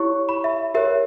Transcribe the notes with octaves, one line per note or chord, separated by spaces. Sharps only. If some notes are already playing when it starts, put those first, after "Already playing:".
Already playing: E4 G4 C#5 C#6
B5
E5
G4 A#4 C#5 E5